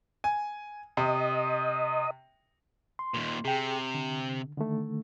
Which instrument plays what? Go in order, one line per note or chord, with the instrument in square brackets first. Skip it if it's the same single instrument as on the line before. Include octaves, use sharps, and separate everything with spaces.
[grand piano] G#5
[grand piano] C3 [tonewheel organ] D#5
[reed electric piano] C6
[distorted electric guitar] D#2 A#2
[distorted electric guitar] C3 [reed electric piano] G#4 G5
[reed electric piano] D3
D3 D#3 A3